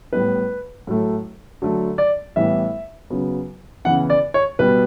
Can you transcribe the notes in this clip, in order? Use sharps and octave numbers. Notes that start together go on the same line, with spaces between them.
A2 G3 B3 B4
A2 F#3 A3
D3 F#3 A3
D5
A2 E3 G3 B3 E5
C#3 F#3 B3
C#3 E3 B3 F#5
D5
C#5
B2 G3 B3 B4